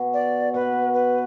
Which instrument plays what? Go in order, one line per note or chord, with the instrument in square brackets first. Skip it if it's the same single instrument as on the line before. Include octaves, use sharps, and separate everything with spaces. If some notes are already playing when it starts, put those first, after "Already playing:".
Already playing: [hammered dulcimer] B2
[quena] D5
[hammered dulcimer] B2 [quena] B4
[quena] B4